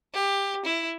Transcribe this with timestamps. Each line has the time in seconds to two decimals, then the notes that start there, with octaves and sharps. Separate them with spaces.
0.13 G4
0.65 E4